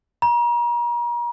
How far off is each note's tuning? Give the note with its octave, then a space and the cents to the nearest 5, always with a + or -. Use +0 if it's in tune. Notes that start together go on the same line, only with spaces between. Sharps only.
A#5 +40